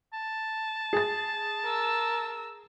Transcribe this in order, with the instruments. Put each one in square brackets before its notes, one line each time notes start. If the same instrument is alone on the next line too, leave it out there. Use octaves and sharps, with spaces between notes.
[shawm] A5
[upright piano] G#4 A6
[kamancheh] A#4 E6